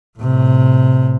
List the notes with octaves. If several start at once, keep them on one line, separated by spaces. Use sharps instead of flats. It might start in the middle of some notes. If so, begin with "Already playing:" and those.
A2 C3